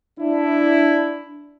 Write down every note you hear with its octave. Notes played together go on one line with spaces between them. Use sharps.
D4 E4